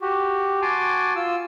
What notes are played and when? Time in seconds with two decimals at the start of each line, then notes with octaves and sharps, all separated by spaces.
0.01 F#4 G4
0.62 F#4 G#5 A5 C6 D6
1.16 F4 E6